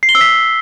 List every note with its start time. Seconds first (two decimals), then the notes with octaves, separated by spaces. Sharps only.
0.03 C7
0.09 G7
0.15 E6
0.21 B6